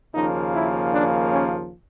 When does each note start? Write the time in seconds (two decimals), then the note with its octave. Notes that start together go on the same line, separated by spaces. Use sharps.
0.15 D#2 C#3 F3 A#3 D#4
0.54 E4
0.93 D4
1.34 C#4